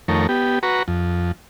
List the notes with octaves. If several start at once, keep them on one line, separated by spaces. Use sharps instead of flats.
F2 D#3 A3 A#4 C#5
B3 G4
F#4 B4 A#5 C#6
F2